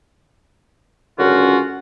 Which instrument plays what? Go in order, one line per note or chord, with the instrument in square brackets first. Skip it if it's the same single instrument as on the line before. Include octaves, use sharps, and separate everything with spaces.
[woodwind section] C#2 F#2 D3 C#4 F4 F#4